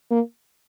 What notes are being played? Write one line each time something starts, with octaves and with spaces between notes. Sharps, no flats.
A#3